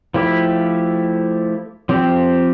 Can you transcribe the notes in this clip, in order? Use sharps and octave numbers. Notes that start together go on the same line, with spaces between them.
F3 A3 E4 G4
F3 C4 G4